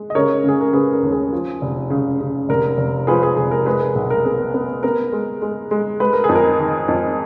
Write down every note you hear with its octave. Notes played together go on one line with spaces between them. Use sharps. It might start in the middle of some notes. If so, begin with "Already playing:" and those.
Already playing: G#3
D#5
C#3 A#4 C#5
C#3 G#4
A#4
C#3 G#4 B4
A#4
D#2
G#4
F3
F1
C#3
C#3
F1 A#4
F1
F3 G#4 B4
G#4
F1 G#4
A#4
G#3 G#4 B4
A#4
B1 G#4
A#4
B3 G#4
B3
B3 A#4
G#3
G#3
G#3
G#3 B4
A#4
G#4
F2
A#4
D#3
F2